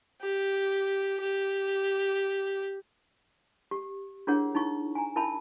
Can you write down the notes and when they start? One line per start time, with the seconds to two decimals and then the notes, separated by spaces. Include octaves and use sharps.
0.21 G4
1.21 G4
3.71 G4
4.27 D4 E4 G#4 A#4 C#5 F#5
4.55 D#4 E4 C#6
4.95 G#5 A#5
5.16 E4 A#4 E5 A5 B5